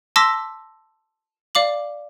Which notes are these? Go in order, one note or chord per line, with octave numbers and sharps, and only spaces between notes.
A5 C6 D6 E6 A#6 B6
D5 F5 D6 F#7